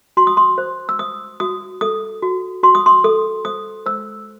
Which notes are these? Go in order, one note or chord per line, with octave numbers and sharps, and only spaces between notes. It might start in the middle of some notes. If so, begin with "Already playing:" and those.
F#4 C6
D#6
C6
C5
E6
C5 D#6
F#4 D#6
A4 D#6
F#4
F#4 C6
D#6
C6
A4 D#6
C5 D#6
C5 E6